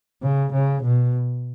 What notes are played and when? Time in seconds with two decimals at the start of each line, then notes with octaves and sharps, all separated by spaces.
0.23 C#3
0.53 C#3
0.83 B2